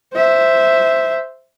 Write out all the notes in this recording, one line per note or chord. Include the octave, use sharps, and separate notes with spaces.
C5 E5